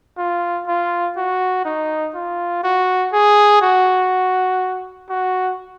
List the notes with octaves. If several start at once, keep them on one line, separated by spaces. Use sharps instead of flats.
F4
F4
F#4
D#4
F4
F#4
G#4
F#4
F#4